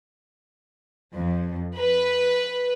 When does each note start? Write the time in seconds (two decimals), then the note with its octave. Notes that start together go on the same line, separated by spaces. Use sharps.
1.14 F2
1.78 B4